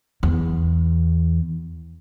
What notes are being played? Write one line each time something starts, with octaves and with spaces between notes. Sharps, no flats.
E2